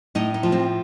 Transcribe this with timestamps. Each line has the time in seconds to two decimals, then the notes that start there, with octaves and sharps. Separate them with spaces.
0.15 A2 D#4
0.34 D#4
0.43 F3
0.52 C4